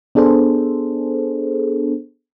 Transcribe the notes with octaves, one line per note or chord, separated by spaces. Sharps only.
B3 D4 G#4 A4 C5